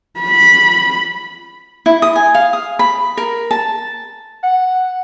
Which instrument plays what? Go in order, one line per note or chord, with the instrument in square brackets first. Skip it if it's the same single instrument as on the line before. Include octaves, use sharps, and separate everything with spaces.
[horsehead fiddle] B5
[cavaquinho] E4
D#6
G#5
F5
D#6
B5
A#4
A5
[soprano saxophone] F#5